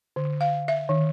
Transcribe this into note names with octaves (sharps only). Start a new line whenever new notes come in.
D3
F5
E5
D#3